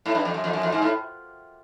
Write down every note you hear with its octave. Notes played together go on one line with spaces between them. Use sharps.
A2
G2
F2
F#2
F2
F#2
F2
G#2
A2